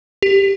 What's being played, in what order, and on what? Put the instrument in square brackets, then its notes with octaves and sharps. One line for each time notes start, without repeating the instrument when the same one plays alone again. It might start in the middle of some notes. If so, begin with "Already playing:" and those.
[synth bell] G4